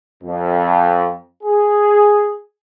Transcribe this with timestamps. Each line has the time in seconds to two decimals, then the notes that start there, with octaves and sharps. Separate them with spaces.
0.24 F2
1.44 G#4